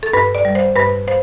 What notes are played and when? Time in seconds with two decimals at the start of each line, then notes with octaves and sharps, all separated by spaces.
0.03 A4
0.13 G2 B4
0.35 D5
0.45 G3
0.55 C5
0.76 G2 B4
1.08 C5